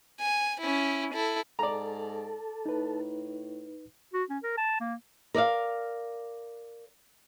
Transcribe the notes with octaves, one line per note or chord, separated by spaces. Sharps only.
G#5
C#4 E4
E4 A4
G#2 A4 D5 A#5
A2 D#4 B4
F#4
C#4
A#4
A5
A#3
A#4 D5 E5 F5